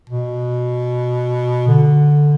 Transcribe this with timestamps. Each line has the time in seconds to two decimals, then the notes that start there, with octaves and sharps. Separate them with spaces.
0.10 B2
1.68 D3